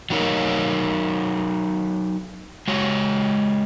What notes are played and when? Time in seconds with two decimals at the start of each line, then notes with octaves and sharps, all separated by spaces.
0.10 F#3 D#4 A#4 C#5
2.68 G#3 F#4 C#5